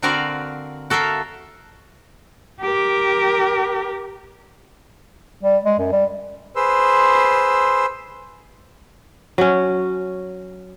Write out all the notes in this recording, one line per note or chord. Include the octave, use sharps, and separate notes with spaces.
D3 C4 F#4 A#4 D5 F5
F#4 A4 A#4 E5 F5
G4 A#4
G3
G#3
F#2
G3
G#4 B4 C5 C6 E6
F#3 C#4